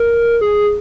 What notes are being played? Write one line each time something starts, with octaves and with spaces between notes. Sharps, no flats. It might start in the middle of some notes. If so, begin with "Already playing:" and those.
Already playing: A#4
G#4